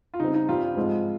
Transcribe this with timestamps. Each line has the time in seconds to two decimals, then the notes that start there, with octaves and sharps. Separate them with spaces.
0.14 F4
0.20 C#3 G3 C4 D#4
0.34 D#4
0.49 G2 G3 C4 F4
0.76 G#2 F3 G#3 C4